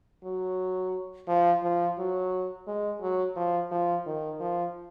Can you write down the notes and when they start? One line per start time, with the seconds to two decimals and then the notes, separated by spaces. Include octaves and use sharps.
0.24 F#3
1.28 F3
1.63 F3
1.98 F#3
2.67 G#3
3.01 F#3
3.36 F3
3.71 F3
4.06 D#3
4.40 F3